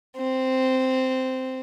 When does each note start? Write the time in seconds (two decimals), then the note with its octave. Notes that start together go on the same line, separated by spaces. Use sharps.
0.17 C4